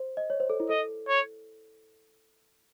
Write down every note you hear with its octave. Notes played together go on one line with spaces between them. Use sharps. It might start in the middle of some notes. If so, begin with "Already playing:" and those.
Already playing: C5
D#5
C#5
C5
A4
E4
A4 D#5
C#5